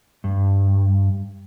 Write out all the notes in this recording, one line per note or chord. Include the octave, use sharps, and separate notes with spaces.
G2